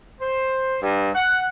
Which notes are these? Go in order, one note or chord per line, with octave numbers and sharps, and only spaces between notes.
C5
G2
F#5